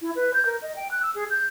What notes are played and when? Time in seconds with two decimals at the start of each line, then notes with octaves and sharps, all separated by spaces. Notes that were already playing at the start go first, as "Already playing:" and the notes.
0.01 E4
0.15 B4
0.34 G6
0.45 A#4
0.62 D#5
0.76 G5
0.91 F#6
1.02 E6
1.15 G#4
1.30 G6